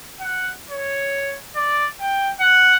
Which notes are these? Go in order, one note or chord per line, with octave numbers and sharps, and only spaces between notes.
F#5
C#5
D5
G5
F#5